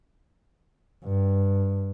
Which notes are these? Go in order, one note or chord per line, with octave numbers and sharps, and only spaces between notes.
G2